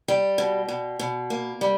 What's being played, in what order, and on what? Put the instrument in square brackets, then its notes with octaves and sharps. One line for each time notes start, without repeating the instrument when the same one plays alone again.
[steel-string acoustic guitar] G3 G5
B2
B2
B2
A#3
G3